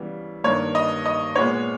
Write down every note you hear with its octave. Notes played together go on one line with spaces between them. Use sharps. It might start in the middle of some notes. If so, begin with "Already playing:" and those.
Already playing: C#3 E3 G3 B3
G2 D#3 A#3 C#5
D#5
D#5
A#2 G#3 B3 C#5